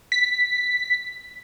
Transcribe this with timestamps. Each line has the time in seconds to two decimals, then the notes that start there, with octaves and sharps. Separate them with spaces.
0.12 B6